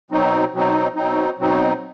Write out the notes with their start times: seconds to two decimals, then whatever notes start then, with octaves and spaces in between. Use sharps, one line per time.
0.11 B2 F#3 C4 D#4
0.53 B2 F#3 C4 D#4
0.96 B2 F#3 C4 D#4
1.39 B2 F#3 C4 D#4